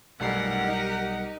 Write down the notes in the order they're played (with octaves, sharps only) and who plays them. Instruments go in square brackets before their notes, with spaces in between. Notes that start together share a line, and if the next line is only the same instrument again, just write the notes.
[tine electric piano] B1 G3 C7 [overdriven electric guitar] A3 D#4 [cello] G4 A#4 [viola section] F#5
[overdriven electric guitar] D#4